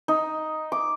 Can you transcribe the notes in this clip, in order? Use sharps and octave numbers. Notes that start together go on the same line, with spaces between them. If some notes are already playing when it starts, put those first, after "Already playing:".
D#4
D6